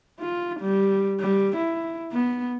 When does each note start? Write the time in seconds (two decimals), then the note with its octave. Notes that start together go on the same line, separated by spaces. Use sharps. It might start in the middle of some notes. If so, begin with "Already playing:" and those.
0.20 F4
0.60 G3
1.20 G3
1.56 E4
2.12 B3